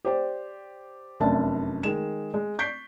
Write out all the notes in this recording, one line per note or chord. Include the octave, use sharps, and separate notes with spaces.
G4 C5 D5
F1 F#2 D4 E5 A5
D#3 G#3 E7
G#3
C#6 G6 B6 C7 D7